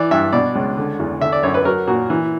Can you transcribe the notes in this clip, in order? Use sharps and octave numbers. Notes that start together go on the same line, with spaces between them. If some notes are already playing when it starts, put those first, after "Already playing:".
Already playing: E3 D5
G2 E5
B2 D5
C#2
D3
E2
D3 E5
D5
F#2 C#5
B4
F#3 A#4
A#2 F#4
E3